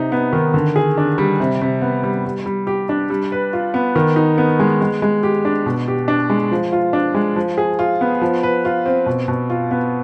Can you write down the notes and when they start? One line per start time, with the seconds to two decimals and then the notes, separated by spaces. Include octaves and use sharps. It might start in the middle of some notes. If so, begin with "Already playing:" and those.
Already playing: C3 D#4
0.12 B3
0.33 D#3
0.54 D3
0.76 G#4
0.98 D4
1.18 G3
1.40 C3
1.61 C3
1.82 B3
2.03 G3
2.25 G3
2.46 G3
2.67 G4
2.89 D4
3.10 G3
3.32 B4
3.53 F4
3.74 B3
3.96 D#3
4.16 D#4
4.38 B3
4.60 G#3
4.81 G#3
5.02 G#3
5.23 G4
5.45 D4
5.66 B2
5.88 G4
6.08 D4
6.30 G#3
6.51 F3
6.72 F4
6.93 D4
7.14 G#3
7.36 F3
7.58 G#4
7.79 F4
8.01 B3
8.21 F3
8.43 B4
8.65 F4
8.86 C4
9.06 B2
9.28 B2
9.50 F4
9.71 B3